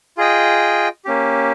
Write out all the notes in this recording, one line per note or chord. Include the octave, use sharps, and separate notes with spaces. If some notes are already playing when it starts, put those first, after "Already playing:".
F4 G#4 D#5 G5
A#3 C#4 G4